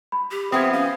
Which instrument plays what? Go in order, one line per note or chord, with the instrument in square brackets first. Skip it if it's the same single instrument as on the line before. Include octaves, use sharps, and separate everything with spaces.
[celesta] B5
[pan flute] G4
[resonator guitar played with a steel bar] F3 B3 C4 [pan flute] E5 [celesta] D#6 G#6
[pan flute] C#4 [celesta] F5